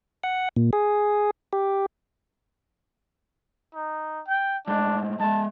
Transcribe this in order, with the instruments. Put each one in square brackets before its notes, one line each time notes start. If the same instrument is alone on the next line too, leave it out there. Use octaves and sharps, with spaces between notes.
[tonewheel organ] F#5
A#2
G#4
G4
[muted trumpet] D#4
G5
[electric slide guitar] A2 G#3 [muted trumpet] D4
[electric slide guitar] G#3 E5 [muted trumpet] A5